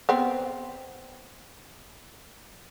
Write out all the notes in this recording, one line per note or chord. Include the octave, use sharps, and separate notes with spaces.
B3 C4